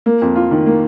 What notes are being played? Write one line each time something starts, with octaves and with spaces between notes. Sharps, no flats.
A#3
F2
F4
D#3
A#3